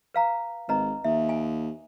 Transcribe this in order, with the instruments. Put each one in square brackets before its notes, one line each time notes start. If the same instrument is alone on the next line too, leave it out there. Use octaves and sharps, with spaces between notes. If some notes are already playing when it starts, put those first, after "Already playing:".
[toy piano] B4 F5 A#5
[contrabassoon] G#1 [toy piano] B4 D#5 A#5
[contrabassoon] D#2 [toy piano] E5
[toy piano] G#5